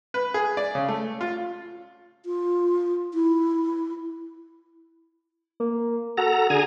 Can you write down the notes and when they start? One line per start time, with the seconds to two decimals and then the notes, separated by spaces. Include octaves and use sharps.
0.14 B4
0.34 G#4
0.57 D5
0.75 C#3
0.88 A3
1.21 F4
2.26 F4
3.14 E4
5.60 A#3
6.17 F#4 A4 A#5
6.50 D3 G#4 G#5 A#5